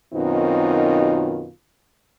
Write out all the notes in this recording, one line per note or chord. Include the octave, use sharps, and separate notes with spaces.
F#2 B2 D#3 C4 D#4 F4